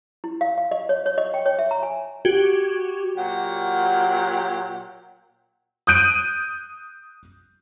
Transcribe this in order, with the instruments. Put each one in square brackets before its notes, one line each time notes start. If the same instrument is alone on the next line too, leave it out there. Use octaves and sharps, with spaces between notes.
[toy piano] E4
F5
F5
D#5
C#5
C#5
D#5
G5
C#5
E5
A#5
G#5
[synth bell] F#4 G4 G#6
[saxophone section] A#2 F#3 G4 F#5
[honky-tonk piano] D#6 F#6 G6 D7 D#7